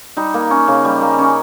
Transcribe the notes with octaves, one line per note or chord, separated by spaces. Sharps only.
G3 D#4
A#3
C#4
C#3
G3
A#3
C#4